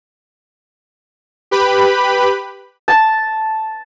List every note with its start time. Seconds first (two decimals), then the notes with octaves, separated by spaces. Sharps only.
1.51 G4 B4 B5
2.88 A5